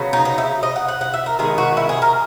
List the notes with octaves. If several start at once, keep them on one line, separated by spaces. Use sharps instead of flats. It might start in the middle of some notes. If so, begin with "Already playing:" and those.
Already playing: C#3 F#3 B3
D#4
D#4
E4
D#5
F#5
F#5
F#5
E5
A#4
D#3 G#3 B3 G#4
F#4
E4
G#4
A#4